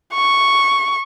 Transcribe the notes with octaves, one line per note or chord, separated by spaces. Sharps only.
C#6